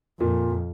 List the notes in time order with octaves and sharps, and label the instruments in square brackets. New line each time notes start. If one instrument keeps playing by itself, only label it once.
[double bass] F2 [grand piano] A#2